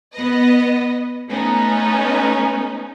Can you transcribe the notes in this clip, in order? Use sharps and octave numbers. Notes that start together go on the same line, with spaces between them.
B3 B4 D#5
A3 B3 C#4 D#4